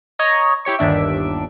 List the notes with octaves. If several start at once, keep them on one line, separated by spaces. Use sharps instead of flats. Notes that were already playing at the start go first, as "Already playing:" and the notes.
C#5 D#5 A#5
E4 G4 C#5 C#6
G1 D#2 D4 E5 D7